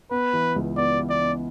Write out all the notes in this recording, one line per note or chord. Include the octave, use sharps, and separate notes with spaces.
B3 B4
E3
C#2
B3 D5
E3
D5
B3